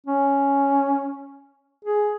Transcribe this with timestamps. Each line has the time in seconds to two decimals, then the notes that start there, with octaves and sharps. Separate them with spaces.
0.06 C#4
1.85 G#4